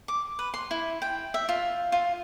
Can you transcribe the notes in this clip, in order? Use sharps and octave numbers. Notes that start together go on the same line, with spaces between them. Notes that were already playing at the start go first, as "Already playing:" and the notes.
D6
B4
C6
E4
G5
E5
F4
F4